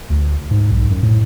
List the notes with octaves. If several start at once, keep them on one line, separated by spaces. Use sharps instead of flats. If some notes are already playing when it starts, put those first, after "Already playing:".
D2
G#2
B1
F#2
A2